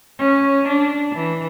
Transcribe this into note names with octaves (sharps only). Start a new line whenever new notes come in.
C#4
D4
E3